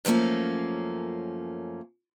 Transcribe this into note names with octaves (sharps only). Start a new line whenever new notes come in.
F#2 F3 A3 A#3 C#4